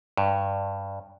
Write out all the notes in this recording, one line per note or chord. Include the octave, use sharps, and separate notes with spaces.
G2